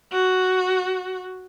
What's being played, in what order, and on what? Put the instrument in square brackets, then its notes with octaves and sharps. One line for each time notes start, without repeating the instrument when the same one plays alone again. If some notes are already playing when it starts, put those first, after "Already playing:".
[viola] F#4